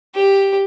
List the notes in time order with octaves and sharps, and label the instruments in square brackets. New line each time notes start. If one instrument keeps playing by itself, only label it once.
[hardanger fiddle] G4